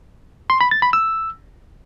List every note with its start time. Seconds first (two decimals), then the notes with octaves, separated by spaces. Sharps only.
0.50 C6
0.61 B5
0.71 A6
0.82 B5
0.93 E6